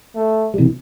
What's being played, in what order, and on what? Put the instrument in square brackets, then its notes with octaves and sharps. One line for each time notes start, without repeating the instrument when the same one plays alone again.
[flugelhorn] A3
[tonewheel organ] G3
C3 E3